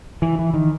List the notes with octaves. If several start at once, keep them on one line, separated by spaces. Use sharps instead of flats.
E3
E3
D#3